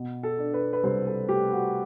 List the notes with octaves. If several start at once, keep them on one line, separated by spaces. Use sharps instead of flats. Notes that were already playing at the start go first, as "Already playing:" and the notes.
Already playing: B2
A4
D4
B4
B4
C2 C5
A4
A3 G4
F#4